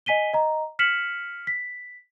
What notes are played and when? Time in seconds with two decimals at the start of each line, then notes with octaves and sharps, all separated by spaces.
0.06 D#5 G#5 B6 D#7 G7
0.33 D#5 A#5
0.79 F6 B6 C#7 E7 F#7
1.47 B6